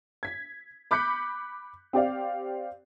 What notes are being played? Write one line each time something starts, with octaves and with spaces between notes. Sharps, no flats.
G#6 B6
B5 D6 F#6 G6 B6 C#7
C4 G4 D5 F5